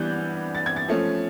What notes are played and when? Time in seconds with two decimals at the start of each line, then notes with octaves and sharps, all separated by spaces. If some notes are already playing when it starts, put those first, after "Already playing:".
Already playing: E3 G3 B3 D4 F#6 G6
0.55 A6
0.66 G#6
0.76 A6
0.88 F3 A3 C#4